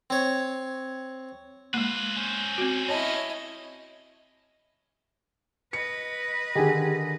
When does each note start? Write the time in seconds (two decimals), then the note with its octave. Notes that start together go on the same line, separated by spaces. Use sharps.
0.10 C4 C#5
1.74 G#3 A#3 F4 B4
2.17 C#4 C5
2.58 C4 F#4
2.89 E4 C#5 D#5 A5
5.73 B4 D#5 C#7
6.55 D3 D#3 G4 G#4 G#5